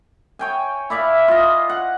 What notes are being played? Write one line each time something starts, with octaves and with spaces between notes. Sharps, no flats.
C#5 G5 G#5
E4 D5 E5 F5
F4 D#5
F#5